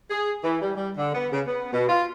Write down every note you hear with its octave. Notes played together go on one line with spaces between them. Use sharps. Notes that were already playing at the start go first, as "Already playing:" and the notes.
G#4
E3
G3
G3
D3
B3
C#3
B3
B2
F4